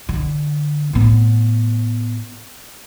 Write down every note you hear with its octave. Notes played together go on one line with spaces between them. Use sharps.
D3
A2 B3